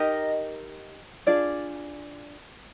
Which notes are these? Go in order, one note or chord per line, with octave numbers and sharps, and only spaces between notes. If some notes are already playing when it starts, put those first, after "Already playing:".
Already playing: D#4 G4 A#4 D#5
D4 F4 G#4 D5